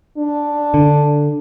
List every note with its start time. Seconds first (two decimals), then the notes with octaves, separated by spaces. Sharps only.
0.18 D4
0.74 D3